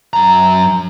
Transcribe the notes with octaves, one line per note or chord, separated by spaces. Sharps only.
F#2 A#5